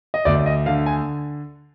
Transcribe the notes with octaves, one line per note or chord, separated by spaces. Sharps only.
D#5
D2 D5
D#5
D3 F5
G#5